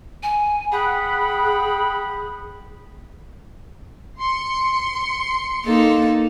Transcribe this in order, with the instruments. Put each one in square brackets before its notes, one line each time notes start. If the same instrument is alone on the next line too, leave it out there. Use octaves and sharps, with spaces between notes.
[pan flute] G#5
[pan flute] G#4 [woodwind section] F#5 G5 B5
[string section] C6 C#7
[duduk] A#3 [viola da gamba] D#4 A4